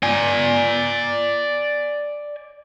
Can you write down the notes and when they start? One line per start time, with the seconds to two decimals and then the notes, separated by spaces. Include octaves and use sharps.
0.03 D5 G#5